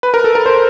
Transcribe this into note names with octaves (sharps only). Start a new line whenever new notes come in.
B4
A#4
A4
A#4
C5